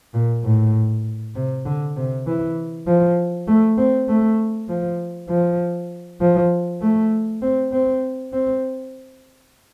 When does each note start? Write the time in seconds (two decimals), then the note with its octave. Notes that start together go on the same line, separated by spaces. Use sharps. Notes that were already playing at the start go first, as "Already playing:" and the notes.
0.14 A#2
0.44 A2
1.35 C3
1.66 D3
1.97 C3
2.27 E3
2.87 F3
3.48 A3
3.78 C4
4.08 A3
4.69 F3
5.30 F3
6.21 F3
6.82 A3
7.42 C4
7.72 C4
8.33 C4